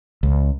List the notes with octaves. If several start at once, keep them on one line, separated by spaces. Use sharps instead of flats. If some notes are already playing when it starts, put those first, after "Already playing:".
C#2